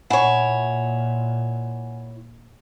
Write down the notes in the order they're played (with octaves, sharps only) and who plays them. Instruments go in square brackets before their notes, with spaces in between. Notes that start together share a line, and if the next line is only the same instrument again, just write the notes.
[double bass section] A#2 [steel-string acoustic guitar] E4 C#5 [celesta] F#5 G#5